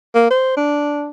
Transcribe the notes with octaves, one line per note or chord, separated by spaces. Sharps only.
A#3
C5
D4